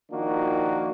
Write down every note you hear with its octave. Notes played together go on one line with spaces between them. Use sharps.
D#3 F3 A#3 D4 F#4